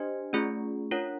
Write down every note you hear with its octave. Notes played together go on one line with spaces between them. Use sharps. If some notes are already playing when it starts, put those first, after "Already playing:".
Already playing: D4 G4 C5 D#5 G#5
A3 C#4 F4 G#4
D4 F4 A#4 C#5 F#5